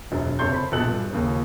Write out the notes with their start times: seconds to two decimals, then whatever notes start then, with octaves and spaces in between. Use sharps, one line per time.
0.12 E1 F#2
0.39 F#1 C3 A4 C#5 C6 G6
0.52 C5 B5
0.72 A#1 B2 A4 F#6 F#7
0.87 G2
1.11 D#2 C#3 F3